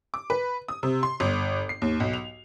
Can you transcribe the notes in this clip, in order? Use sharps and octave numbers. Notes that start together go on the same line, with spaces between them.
D6
B4
D#6
C3
C6
G1
C7
D#2
B1
F7